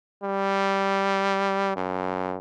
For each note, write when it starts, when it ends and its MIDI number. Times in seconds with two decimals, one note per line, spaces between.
0.23 1.76 55
1.76 2.37 42